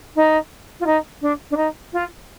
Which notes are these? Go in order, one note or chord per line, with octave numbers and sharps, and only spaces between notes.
D#4
F4
D#4
D4
D4
D#4
F4